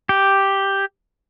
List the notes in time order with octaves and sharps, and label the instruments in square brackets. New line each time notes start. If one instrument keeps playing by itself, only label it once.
[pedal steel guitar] G4